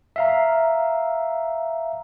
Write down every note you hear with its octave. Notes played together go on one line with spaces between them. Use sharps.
E5 F5 A#5